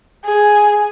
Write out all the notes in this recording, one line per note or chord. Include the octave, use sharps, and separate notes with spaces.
G#4